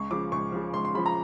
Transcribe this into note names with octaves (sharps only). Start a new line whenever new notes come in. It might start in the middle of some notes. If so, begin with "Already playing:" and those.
Already playing: C#2 C#6
C#3 F3 D6
C#2 C#6
C#3 F3
C#2 C6
C6
C#3 F3 B5
A#5